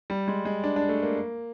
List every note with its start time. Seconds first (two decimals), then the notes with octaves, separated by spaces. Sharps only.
0.10 G3
0.28 G#3
0.45 G#3
0.64 D4
0.76 D4
0.89 A3
1.03 A#3